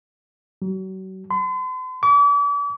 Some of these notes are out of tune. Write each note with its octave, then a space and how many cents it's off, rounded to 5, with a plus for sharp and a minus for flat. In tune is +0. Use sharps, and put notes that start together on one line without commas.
F#3 +35
C6 -45
D6 -40